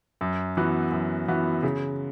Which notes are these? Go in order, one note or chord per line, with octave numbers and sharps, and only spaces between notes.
F#2
E3 B3 F#4
F#2
E3 B3 F#4
C#3